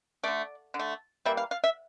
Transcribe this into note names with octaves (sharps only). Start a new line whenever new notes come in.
D3 A3 D5
D3
A3
E3 G3 A#3 E5
F5
F5
E5